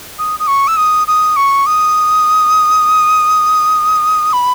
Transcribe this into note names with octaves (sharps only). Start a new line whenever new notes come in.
D#6
D#6
C#6
E6
D#6
D#6
C#6
D#6
B5